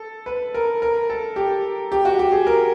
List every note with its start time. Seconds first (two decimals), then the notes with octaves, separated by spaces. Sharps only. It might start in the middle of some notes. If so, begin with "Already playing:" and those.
Already playing: A4
0.26 B4
0.54 A#4
0.82 A#4
1.10 A4
1.36 G4
1.92 G4
2.05 F#4
2.19 G4
2.32 G#4
2.47 A#4